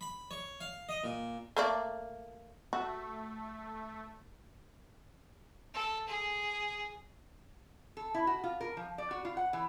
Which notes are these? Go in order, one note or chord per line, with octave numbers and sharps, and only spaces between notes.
B5
C#5
F5
D#5
A#2
A3 A#3 D5
A3 F#4
A4
G#4
A4
E4
F#4
F4
A#4
F3
D5
F#4
F4
F#5
E3